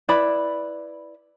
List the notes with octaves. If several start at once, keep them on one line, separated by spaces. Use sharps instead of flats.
E4 B4 D5 B5